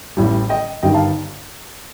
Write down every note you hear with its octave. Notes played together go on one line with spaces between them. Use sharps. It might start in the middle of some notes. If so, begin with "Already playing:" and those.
A1 A2 G3
D#5 G5
G1 G2 D#3 G3 D#5 G5
F5 A5